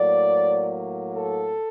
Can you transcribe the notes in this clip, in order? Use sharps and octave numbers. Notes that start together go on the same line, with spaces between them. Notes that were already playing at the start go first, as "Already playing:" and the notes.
Already playing: A2 F#3 A#3 D5
A4